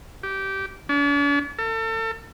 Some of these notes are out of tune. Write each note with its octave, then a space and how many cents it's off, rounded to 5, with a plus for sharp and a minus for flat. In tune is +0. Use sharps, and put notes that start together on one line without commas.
G4 -15
D4 -45
A4 +35